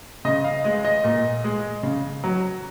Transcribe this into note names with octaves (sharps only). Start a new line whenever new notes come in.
C#3 D#5
F5
G#3 D#5
D#5
A#2
G#3
C#3
F#3